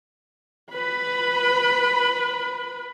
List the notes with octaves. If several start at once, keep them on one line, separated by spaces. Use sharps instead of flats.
B4 B5